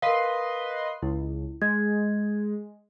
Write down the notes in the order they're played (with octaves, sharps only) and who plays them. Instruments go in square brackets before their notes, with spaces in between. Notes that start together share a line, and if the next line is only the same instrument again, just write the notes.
[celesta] A#4 F5 [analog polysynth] B4 D#5 C6
[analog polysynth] C#2 [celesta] E4
[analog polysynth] G#3 [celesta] G#6